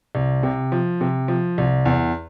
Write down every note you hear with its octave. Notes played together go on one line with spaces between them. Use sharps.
C2
C3
F3
C3
F3
C2
E2